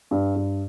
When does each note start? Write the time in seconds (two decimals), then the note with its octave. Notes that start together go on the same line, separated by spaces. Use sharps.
0.11 G2
0.36 G2